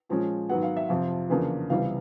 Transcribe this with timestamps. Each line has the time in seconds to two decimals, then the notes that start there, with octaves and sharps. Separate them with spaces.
0.09 A#2 F3 G#3 C#4
0.49 G#2 D#3 F#3 B3 F#5
0.63 F5
0.77 E5
0.89 F2 C3 F3 F5
1.30 E2 C#3 F3 A#3 D4
1.70 C#2 C3 E3 G3 B3 F5